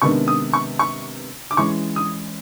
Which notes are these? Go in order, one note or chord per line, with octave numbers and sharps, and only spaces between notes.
C3 D#3 G#3 B3 D4 C#6
D#6
C#6
C#6
D6
E3 G#3 C#4 C#6
D#6